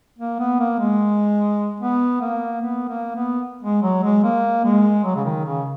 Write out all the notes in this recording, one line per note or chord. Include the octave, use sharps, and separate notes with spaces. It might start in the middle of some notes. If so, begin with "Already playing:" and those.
A#3
B3
A#3
G#3
B3
A#3
B3
A#3
B3
G#3
F#3
G#3
A#3
G#3
F#3
C#3
D#3
C#3